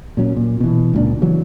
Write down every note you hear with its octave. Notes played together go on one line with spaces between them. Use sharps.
A#2 F#3 C#4
A#2
B2 E3
C#2 A#2 D4
C#3 E3 F#3